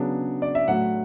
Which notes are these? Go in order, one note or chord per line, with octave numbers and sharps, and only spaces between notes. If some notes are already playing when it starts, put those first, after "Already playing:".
Already playing: C#3 F#3 B3 D4
D5
E5
A2 F#3 A3 F#5